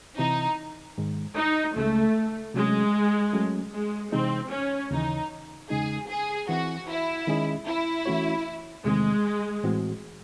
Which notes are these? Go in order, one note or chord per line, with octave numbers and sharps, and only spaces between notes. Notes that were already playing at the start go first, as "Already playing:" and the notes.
C3 E3 C4 D#4 E4
G#2 D#3 G#3
D#4
C#2 C#3 G#3 A3
C3 F#3 G#3 A3 C#4
F#3 A3 C#4
G#3
C3 E3 G#3 C4 D#4
C#4
D#2 C#3 E3 D#4
E2 C#3 G#3 D#4 G#4
G#4
E3 C4 E4 F#4
E4
D#3 G#3 C#4 G#4 D#5
E4
E3 A3 C#4 F#4 C#5
E2 C3 D#3 G#3 A3 C4
A2 E3 C4 F#4